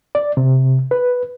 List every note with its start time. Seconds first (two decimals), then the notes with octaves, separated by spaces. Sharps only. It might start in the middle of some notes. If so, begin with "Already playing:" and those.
0.15 D5
0.37 C3
0.91 B4